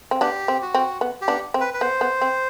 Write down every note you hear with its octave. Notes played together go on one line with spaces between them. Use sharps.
C4
B3 D4 G4
C4
F#4
C4
B3
G4
B3 D4
C4
B4
B4
B3 C5
B3
C4